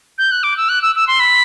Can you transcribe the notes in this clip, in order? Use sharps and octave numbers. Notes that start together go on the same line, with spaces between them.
G6
F#6
D6
E6
F#6
E6
E6
C6
B5